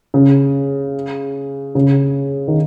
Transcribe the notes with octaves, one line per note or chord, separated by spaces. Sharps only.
C#3
C#3
D#3